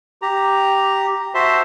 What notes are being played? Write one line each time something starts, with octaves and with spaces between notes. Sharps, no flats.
G4 A#5
F#4 C5 E5 A5 C6